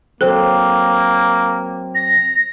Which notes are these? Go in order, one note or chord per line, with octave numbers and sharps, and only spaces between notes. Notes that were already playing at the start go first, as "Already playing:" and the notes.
F#3 A#3 C4 A4 C5
A#6